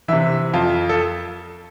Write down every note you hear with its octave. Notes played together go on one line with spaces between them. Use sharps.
C3 E3 E5
F2 F4
A4